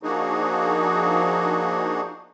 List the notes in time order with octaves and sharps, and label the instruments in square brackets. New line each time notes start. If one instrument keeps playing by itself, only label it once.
[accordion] F3 A#3 D4 D#4 F#4 G#4